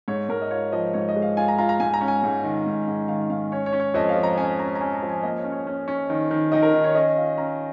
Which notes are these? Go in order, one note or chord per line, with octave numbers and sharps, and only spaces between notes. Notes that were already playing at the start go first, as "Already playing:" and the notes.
G#2 C#5
G#2 A#4
D#5
F4 C#5
F3 D#5
G#2 C#5
D#5
G#3
F5
F4 G#5
A#5
F4 A#5
A#5
G#2 G#5
A#5
C#4
G#5
G#2
D#3
G#2
G#2
D#3 F5
G#2 F5
C#4 C#5
C#5
C#4
C#5
F2 D#5
F5
F3
A#5
C#4 G#5
C#4 A#5
A#5
C#4 G#5
A#5
F3
G#5
A#3 D#5
C#5
C#4
C#5
C#4
C#4
D#3
D#3
D#3 D#5
A#4
D#3
C#5
C#4 D#5
F4 F5
C#4 A#5